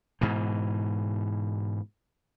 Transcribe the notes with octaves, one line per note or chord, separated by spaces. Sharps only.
G#2 B2 E3